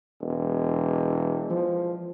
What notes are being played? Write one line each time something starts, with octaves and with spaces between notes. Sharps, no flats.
E1
F3